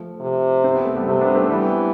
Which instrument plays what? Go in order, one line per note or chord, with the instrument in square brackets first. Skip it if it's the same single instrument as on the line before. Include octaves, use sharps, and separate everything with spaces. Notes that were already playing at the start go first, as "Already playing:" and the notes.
Already playing: [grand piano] F3 A3
[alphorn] C3
[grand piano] C4
B3
A3
G3 B3
[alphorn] C3 [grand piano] A3 C4
[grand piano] B3 D4
A3 C4
[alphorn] E3 [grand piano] G3 B3